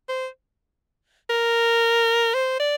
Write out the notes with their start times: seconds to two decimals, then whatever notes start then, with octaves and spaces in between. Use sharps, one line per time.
0.09 C5
1.30 A#4
2.34 C5
2.59 D5